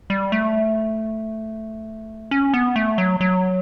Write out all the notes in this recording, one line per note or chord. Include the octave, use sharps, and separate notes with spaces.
G3
A3
C#4
B3
A3
F#3
F#3